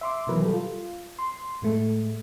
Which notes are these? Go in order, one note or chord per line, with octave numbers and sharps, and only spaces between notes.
E5 C6 D6
B2 D#3 E3 F#3 A#4 B4
G3 A4
F4
C6
A2 G#3 A3